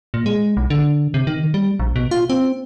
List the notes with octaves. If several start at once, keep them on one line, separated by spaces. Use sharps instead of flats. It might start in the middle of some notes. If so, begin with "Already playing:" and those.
A#2
G#3
B1
D3
C3
D#3
G3
A#1
B2
F4
C4